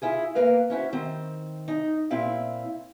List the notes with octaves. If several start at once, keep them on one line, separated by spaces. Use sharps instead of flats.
E4 F4 G#4
A#3 A#4 B4 F5
C#4 E4 F#4 C5
D#3 C4
D#4
A#2 C4 E4 F5